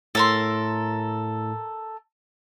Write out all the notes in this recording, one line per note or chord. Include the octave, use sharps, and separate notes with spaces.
A2 A4 A#4 C6 E6